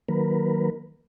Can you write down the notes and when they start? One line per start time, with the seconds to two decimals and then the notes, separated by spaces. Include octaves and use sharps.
0.09 D#3 F#3 A#3 A#4 B4